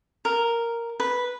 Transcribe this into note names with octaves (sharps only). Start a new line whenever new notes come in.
A#4
B4